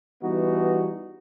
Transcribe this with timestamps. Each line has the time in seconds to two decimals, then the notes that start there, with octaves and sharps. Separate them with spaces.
0.22 E3 G3 B3 D#4 F#4